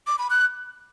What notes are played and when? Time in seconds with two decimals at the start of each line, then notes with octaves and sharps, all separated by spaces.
0.07 D6
0.19 B5
0.30 F#6